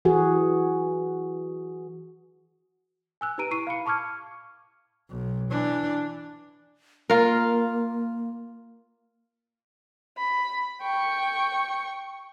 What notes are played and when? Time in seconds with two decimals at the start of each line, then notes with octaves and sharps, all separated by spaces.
0.05 E3 F#4 G#4
3.21 G#5 E6 F#6
3.38 D#4 G4 B4 A#5 D7 D#7
3.51 E4 C#6 C7 D#7
3.67 F5 B5 C#7
3.86 A5 C#6 D6 F6 G#6
5.10 B1
5.51 E3 D4
7.10 A#3 F4 A#4
10.18 B5
10.82 G5 C#6